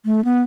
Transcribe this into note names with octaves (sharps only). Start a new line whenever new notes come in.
A3
B3